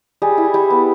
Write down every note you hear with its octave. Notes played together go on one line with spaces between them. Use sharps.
G3 G#4
E4
G3
B3